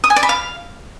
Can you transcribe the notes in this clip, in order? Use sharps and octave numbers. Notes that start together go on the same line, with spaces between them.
D#6
G#5
D5
B5
F5